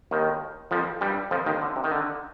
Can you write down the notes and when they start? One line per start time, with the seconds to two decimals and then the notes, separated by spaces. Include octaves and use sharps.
0.11 D#2 D#3
0.71 F2 F3
1.01 G2 G3
1.31 F2 F3
1.46 D#2 D#3
1.62 D3
1.76 C3
1.84 D#3
1.91 D3